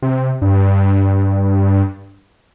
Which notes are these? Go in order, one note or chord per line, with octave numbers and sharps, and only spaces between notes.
C3
G2